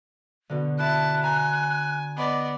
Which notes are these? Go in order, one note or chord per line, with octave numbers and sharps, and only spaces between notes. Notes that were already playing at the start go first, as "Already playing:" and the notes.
B2 D3
E4 A5 F#6
G#5 A#5 C6
B3 D5 D#5